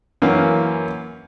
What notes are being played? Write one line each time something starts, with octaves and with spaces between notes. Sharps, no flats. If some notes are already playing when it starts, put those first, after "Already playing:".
F#2 E3 A#3 C#4 F5